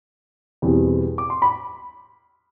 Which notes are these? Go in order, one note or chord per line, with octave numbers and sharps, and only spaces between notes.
E2 B2 G3 C4
D6
C6
B5